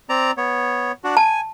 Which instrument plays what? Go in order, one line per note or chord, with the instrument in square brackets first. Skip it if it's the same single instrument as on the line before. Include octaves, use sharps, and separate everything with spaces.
[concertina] C4 D5 A#5
B3 C#5
D4 F#4
[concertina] G#5 [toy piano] A5